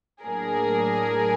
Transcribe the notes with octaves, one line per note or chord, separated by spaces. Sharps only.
A2 F#3 A#3 D4 G#4 A#4